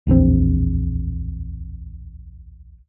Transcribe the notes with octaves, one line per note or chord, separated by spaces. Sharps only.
D1 A#1 E2 C4